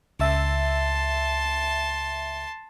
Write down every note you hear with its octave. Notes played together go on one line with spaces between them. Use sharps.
C#2 E5 A5 C6